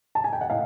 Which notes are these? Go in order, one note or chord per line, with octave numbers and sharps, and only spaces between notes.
A5
G#5
G5
F#5
A2 D#5 F5